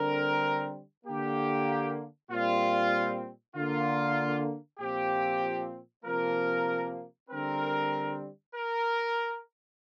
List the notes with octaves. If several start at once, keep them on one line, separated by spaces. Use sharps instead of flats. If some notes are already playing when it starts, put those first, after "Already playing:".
Already playing: D3 G3 C4 A#4
D3 A#3 G4
A#2 G3 C4 F4
D3 A#3 F4
A#2 F3 C4 G4
C3 F3 A#3 A#4
D3 G3 C4 A#4
A#4